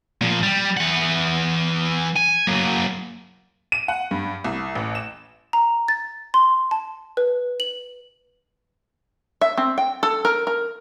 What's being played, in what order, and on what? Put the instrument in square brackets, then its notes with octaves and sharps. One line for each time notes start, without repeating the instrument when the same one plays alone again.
[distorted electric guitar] A#2 F3
G3
E3 F#5
G#5
F#3 A#3
[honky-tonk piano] D#7
F#5
G2
C2
A1
E7
[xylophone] A#5
A6
C6
A5
B4
F#7
[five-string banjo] E5
C4
G5
A4
A#4
A#4